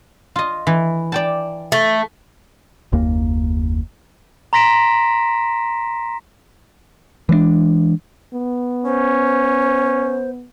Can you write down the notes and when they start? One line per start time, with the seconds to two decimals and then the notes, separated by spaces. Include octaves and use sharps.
0.36 F4 D#5
0.67 E3
1.12 D5 G5 A5
1.72 A3
2.92 F#1 D#2 A#3
4.53 A#5 C6 A#6 B6 D7 E7
7.29 E3 G#3 A3 D4
8.34 B3
8.85 C#4 C5